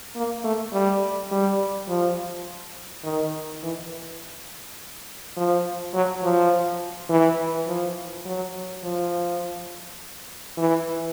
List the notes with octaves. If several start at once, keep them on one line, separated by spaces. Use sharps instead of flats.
A#3
A3
G3
G3
F3
D#3
E3
F3
F#3
F3
E3
F3
F#3
F3
E3